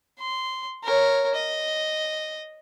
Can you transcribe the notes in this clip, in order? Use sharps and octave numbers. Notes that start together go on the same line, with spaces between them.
C6
A#4 C#5
D#5